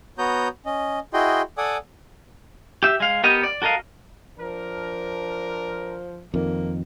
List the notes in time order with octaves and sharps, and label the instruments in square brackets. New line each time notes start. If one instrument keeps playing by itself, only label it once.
[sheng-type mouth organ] B3 F#4 C#5 A#5 D#6 G6
C#4 D#5
E4 F#4 G#4 D#5 G5 C6
A4 D5 F#5 G#5 D6 D#6
[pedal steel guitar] G4 E5
G#3 F5
B3 G4 A#4 D#5
D5
F#4 A4 A#4 D#5 F5
[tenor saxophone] F3 [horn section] D4 A#4
[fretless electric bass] F2 D#3 [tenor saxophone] A#3